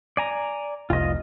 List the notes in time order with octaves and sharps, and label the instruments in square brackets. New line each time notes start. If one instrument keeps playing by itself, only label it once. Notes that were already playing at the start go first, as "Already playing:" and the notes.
[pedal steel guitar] D5 G#5 A#5
[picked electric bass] F1 C2 [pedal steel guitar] F4 D#5